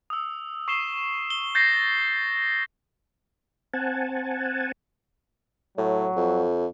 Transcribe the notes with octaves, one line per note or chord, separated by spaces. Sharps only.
D#6 E6
C#6 C7 E7 G7
G7
G6 A6 A#6 C7
C4 F#5 G#5 A5
A2 F#3
F2